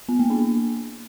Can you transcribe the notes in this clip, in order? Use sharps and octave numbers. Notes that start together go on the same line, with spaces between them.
B3
A#3
D4